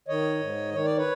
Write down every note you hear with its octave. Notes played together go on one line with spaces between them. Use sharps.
D#3 C#5 D#5
G#2
D#3 C#5
D5
B4 C#5